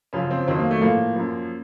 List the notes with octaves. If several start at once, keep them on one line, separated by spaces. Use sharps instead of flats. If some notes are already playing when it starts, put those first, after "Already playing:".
F#2 C#3 F3 C#4
C4
F2 D#3 F#3 C4
A#3
A3
A2 F3 A#3
F#2 F3